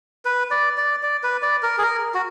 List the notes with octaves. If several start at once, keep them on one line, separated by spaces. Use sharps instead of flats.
B4
D5
D5
D5
B4
D5
A#4
G#4
A#4
F#4